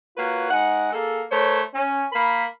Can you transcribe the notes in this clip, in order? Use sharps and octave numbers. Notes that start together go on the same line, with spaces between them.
A#3 F4 F#4 B4 C#5
G#3 D#4 F#5
A#3 G#4 A4
A3 A#4 C5 C#5
C#4
A#3 A#4 B5